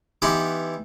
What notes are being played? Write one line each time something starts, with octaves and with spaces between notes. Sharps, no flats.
E3 B3 D#4 E4 G4 C6